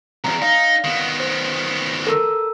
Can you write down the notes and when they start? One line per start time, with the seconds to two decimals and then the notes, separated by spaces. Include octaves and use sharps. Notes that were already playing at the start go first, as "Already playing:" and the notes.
0.24 B1 E2 A#5
0.42 D#4 F5
0.84 D#3 B3
1.20 C5
2.07 A4 A#4 E6